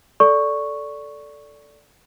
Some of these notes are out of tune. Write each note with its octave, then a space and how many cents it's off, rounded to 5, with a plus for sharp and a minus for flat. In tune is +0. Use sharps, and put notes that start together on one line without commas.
A4 +0 D5 -15 C#6 +0